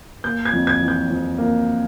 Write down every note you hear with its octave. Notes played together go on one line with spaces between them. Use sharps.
A#3 G6
G#6
F2
G#6
E3
G6
F2
A#3